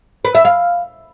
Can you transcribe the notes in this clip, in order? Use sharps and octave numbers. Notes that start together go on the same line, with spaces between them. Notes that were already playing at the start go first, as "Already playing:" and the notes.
B4
E5
F5